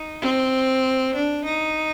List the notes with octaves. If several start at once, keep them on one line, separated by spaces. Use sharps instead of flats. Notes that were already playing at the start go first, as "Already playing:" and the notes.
Already playing: D#4
C4
D4
D#4